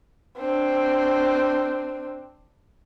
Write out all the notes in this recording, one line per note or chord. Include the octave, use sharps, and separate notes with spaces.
C4 D4